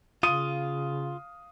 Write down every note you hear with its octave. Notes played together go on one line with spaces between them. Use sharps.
C#3 F4 F5 D#6 D#7